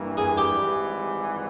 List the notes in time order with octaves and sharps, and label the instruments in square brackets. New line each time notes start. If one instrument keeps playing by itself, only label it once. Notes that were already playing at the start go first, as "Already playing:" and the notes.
Already playing: [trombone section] G2 E3 G3 A#3
[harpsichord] G#4
G4
[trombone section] G#1 G#2 E3 G3